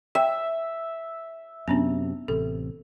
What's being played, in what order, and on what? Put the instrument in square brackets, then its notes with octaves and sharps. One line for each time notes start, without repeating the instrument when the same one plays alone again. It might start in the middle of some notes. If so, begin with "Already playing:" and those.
[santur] E5 [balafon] G5
[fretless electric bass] F#2 C3 [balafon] B3 C#4 D4
[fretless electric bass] A1 C3 [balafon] A4